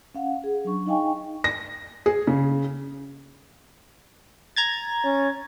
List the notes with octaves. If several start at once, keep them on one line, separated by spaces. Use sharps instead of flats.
C#4 F5 F#5
G#4
F#3 D4 C#6
D#4 D#5 F5 G5 G#5 C#6
A#6
G#4
C#3
A#5 G#6 A6
C#4